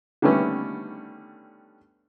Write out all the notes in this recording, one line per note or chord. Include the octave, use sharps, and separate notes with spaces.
D3 D#3 G3 A3 B3 C#4